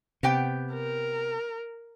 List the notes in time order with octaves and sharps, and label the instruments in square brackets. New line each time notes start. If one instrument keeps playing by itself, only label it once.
[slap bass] C3 [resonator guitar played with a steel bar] B3 G4 G5
[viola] A#4